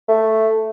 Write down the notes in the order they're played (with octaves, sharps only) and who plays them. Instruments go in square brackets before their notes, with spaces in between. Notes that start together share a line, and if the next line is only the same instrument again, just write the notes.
[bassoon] A3